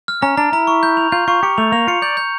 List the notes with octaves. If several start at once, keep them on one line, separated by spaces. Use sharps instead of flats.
F6
C#4 A#5
D4 A#5
E4 A#5
C#6
G6
F7
F4 G6
F4 C#6
G4 C#7
A3 F7
A#3 F7
F4 C#7
D5 G6
G6